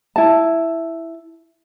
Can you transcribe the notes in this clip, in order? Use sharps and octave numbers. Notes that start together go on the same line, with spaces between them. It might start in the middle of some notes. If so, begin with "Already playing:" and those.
E4 A5